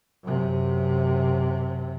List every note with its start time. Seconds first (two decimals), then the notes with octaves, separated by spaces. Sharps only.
0.23 F#2 C3